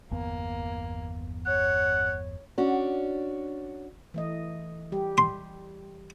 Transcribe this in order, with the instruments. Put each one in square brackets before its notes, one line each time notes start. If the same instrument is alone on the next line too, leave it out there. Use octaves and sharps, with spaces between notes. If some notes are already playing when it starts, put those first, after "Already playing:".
[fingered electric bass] G1 E2 B3 [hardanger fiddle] A#3
[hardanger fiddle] C#5 [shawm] F#5
[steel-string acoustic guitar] C#4 D4 F#4
[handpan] E3 A3 D#5
G3 G4
[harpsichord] C6